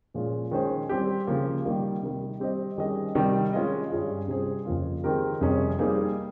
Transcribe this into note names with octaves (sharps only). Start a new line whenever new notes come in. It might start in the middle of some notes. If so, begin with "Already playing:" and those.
A#2 F3 G#3 C#4 F4
D#3 G#3 C#4 G#4 C5
G3 C4 G4
C#3 F3 A#3
D#3 G3 A#3
C3 D#3 G3
G3 C4 G4 C5 D#5
D#3 G3 C#4 G#4 D#5
C3 D#3 G3
G#3 C#4 F4 G#4 D#5
G2 G3 C#4 F4 G#4
C3 G3 C#4 G#4 C5
F2 C#3 F3 A#3 F4
D#3 G#3 C4 G4 A#4
F2 C3 G3 C#4 G#4
G3 A#3 D#4 G#4 C5